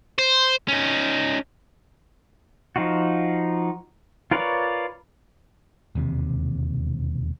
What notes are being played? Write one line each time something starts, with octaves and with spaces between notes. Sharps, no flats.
C5
C#4 D#4
F3 D#4 F4 F#4
F4 A#4 B4 C#5 D5
E1 D#2 C3